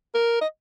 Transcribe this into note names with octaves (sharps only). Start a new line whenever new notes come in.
A#4
D#5